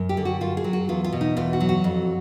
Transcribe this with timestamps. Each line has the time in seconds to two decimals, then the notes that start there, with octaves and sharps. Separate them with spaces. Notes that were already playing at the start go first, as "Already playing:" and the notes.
Already playing: F#2
0.09 G4
0.17 D3
0.25 F#4
0.41 F#2 F4
0.57 G#4
0.64 F#3
0.73 F#4
0.89 E2 F4
1.04 F4
1.13 B2
1.21 D#4
1.37 E2 F4
1.53 F#4
1.60 F#3
1.69 F#4
1.84 F2